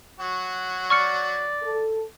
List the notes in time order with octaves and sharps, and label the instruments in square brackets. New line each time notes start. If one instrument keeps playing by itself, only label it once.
[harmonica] F#3 F#4
[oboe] D5 [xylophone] C#6 F6 C#7
[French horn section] A4